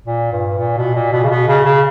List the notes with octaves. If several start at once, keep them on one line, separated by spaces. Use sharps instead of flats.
A#2
G2
A#2
B2
A#2
B2
C#3
B2
C#3
C#3